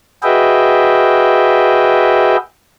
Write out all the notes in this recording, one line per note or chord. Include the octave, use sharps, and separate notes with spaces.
F#4 G#4 B4 D#5 E5 G5